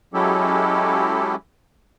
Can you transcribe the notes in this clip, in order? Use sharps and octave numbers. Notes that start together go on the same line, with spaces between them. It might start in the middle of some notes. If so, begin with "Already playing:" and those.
F#3 G#3 C#4 E4 G4 A4